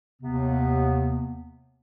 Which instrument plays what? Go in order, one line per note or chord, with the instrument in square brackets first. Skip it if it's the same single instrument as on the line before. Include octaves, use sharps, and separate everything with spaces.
[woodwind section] D#2 C3 B3